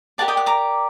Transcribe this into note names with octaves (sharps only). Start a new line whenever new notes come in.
G4 A#4 D5 F#5 A5
D#5 G5
F#5
A#5 D6